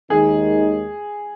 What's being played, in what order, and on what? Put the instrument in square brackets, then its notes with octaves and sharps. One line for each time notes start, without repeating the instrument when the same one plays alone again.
[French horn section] D#2 D#3 G#3 D#4 [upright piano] G#4